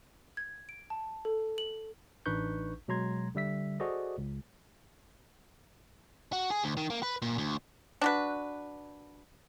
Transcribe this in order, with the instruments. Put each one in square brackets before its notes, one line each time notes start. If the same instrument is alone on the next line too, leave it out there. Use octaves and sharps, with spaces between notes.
[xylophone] G#6
D7
A5
A4
F#7
[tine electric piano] A1 D4 D#4 B4 C#6 G6
B2 F#3 G#3 A#5 C6 G#6
D3 G3 E5 B6
F#4 G#4 A4 C5 D5 D#5
C#2
[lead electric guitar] F#4
G#4
D2
D#3
A#3
B4
A#2
D2
[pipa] D4 F#4 B4